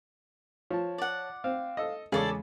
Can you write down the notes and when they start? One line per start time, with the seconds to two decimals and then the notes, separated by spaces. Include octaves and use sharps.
0.71 F3 C#5 A5
0.98 D5 F#5
1.44 C4 F5
1.77 A4 D#5
2.12 E2 C#3 G#3 G#4 A4 D5